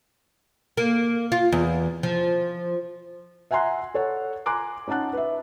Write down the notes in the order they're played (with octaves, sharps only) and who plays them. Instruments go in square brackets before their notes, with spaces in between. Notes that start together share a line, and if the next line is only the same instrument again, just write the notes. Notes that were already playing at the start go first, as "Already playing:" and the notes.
[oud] A#3
F4
E2
F3
[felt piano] E5 F#5 G#5 A#5 C6 F#6
A4 C#5 F#5
G#5 A#5 C6 D6 F#6 D7
C#4 D#4 F#5 A5 F#6
B4 E5